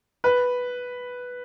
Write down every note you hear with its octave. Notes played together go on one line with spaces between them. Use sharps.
B4